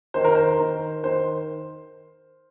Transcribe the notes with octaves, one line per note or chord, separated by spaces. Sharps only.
D#3 C5
A#4
C5
D#3
D#3 C5